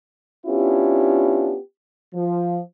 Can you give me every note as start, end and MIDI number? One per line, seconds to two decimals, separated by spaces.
0.47 1.58 59
0.47 1.58 61
0.47 1.58 62
0.47 1.58 64
0.47 1.58 65
0.47 1.58 67
2.15 2.60 53